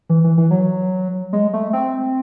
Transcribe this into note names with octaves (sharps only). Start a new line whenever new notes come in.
E3
E3
E3
F#3
G#3
A3
C4